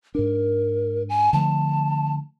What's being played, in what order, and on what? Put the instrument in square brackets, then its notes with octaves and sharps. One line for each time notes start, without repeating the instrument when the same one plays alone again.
[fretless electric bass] G#2 D4 [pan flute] A#4
[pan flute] G#5
[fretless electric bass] D3 F3 A3 [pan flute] A5